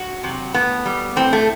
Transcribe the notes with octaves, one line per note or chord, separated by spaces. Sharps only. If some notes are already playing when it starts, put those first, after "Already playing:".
Already playing: F#4
C3 F#3
A2 B3
G3
A2 C4
A3